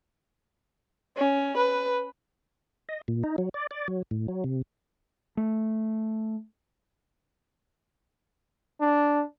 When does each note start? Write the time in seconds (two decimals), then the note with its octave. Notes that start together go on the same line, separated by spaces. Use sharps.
1.17 C#4
1.57 B4
2.89 D#5
3.08 A#2
3.24 D#4
3.38 F#3
3.54 D5
3.71 D5
3.88 F#3
4.11 A2
4.28 F#3
4.44 C3
5.37 A3
8.81 D4